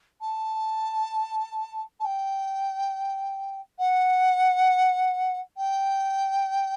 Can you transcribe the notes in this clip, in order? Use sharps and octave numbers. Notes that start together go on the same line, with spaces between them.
A5
A5
G5
F#5
G5